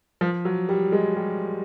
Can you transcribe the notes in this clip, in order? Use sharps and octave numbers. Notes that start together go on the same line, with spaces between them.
F3
F#3
G3
G#3
G3